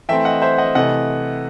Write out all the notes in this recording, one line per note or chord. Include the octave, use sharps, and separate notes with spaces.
E3 A3 C4 E5 G5
D#5 F#5
C5 E5
D#5 F#5
C3 E3 A3 D#5 F#5